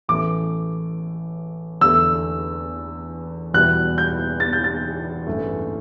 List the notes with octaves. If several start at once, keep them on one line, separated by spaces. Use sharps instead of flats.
A1 A2 E3 A3 D6
E2 D3 A3 E6
E2 B2 G3 B3 E4 F#6
G6
A6
G6
A6
A1 G2 E3 A3